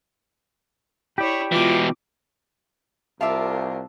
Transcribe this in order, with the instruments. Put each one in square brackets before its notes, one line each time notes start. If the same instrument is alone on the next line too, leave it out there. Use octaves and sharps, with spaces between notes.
[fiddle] E4 C#5 [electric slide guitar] G4 D5
[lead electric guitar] B2 E3 [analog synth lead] F4 [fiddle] D6
[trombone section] C2 [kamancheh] F4 A#4 [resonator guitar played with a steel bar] E5 F5 [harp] A5 D6 E6